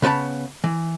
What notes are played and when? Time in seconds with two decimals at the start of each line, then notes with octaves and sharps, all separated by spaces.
0.02 C#3 B3 B4 A5 B5
0.64 E3